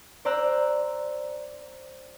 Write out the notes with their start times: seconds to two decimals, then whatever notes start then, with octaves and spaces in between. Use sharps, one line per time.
0.25 C5 D5 A#5 E6 F#6